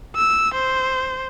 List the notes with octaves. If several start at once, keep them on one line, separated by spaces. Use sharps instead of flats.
E6
C5